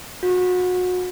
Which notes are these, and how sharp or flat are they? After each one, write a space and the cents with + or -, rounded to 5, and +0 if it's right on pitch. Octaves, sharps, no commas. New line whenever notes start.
F#4 -30